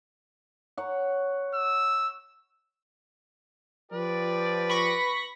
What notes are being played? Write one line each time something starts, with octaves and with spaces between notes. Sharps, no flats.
C#5 F#5
E6
F3 G4 B4 D5
B5 C#6 A#6